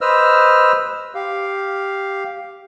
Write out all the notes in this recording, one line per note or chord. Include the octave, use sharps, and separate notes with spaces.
B4 C5 D#5 E6 F6
G4 F5